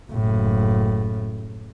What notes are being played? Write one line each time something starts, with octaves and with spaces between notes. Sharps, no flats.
F#1 A2